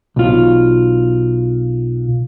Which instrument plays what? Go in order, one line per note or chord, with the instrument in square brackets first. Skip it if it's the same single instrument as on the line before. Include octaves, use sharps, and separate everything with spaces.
[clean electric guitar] B1 F4